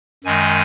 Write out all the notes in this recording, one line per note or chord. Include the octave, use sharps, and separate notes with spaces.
F#2 D#3 G#3 G#5